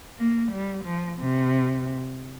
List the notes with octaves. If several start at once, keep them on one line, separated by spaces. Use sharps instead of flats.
A#3
G3
F3
C3